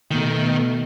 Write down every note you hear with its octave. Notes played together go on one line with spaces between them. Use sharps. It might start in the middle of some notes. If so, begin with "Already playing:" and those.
B2 D#3 A3